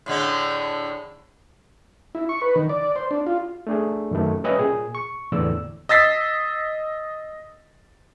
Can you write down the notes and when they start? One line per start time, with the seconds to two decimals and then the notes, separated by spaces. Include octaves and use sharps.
0.06 A2 D3 G#3
2.15 E4
2.29 C#6
2.42 B4
2.56 D#3
2.69 D5
2.96 C5
3.11 D4
3.26 F4
3.67 A3 D4 G#4
4.11 F#2 D#3 A3
4.44 G3 C#4 B4 D#5 E5 G5
4.59 A#2 G#4
4.95 C#6
5.32 E2 A2 D3 D5 E6
5.89 D#5 E6 A6 B6 C7